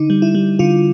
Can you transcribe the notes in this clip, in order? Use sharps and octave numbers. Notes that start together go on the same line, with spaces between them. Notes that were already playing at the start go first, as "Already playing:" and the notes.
Already playing: D3 D#4
G3
E4
G3
D3 F4